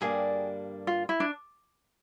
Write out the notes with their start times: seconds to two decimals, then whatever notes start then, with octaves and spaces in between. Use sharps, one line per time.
0.01 G2 D3 G3 A#3 D4 G#4
0.87 F4
1.09 E4
1.20 D4